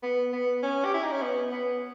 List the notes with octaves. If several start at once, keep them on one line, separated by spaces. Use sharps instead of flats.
B3
B3
C#4
G4
E4
D#4
C#4
B3
B3